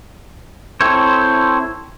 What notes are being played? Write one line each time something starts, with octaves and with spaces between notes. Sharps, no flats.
C4 E4 A4 C5 C#5